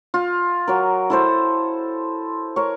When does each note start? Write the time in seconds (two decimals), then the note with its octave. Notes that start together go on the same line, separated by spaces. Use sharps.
0.14 F4
0.68 F#3 A#4
1.10 E4 A4 C5
2.56 A#4 C#5